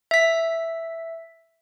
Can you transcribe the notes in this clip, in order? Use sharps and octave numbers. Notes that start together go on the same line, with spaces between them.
E5 B6